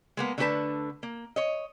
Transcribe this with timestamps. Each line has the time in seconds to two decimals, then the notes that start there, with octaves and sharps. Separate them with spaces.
0.17 G#3 A#3 B3
0.38 D3 A3 D4 G4 B4 A5
1.03 A#3
1.36 C#5 D#5